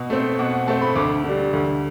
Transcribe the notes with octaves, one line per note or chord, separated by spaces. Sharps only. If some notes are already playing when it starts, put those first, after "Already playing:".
Already playing: B2
A3 C4
B2 F#5
F#5
A3 C4 A5
B5
D2 D6
D3 G3
D2